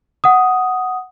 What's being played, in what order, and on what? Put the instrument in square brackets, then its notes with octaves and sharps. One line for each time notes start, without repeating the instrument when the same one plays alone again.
[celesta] F#5 D#6